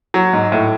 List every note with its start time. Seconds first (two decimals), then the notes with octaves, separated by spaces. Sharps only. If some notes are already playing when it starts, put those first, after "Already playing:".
0.14 F#3
0.33 G#2
0.52 A2